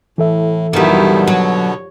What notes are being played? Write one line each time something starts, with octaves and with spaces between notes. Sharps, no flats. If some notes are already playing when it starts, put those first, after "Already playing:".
A2 E3 A4 E5
F#2 B2 D3 D#3 F3 G3 B3 E4
F#3 C#5